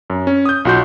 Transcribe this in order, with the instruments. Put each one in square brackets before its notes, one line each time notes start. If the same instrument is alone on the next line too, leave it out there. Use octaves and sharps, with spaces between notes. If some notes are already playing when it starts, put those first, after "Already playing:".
[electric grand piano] F#2
C#4
D#6 G6
B1 F4 F#4 C6 G6